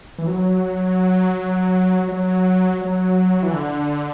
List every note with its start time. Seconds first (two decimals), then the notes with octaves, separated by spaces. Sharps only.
0.19 E3
0.27 F#3
2.08 F#3
2.81 F#3
3.43 E3
3.53 D3